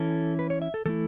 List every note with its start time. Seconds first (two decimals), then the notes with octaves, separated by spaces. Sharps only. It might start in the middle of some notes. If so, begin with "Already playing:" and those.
Already playing: E3 C#4 E4 A4
0.39 B4
0.50 C#5
0.62 E5
0.74 A4
0.85 E3 A3 E4 A4